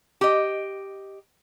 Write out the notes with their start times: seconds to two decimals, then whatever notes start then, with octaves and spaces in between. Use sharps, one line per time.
0.21 G4 D#5